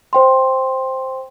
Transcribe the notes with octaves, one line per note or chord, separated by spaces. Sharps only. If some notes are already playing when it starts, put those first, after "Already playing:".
C5 G5 C6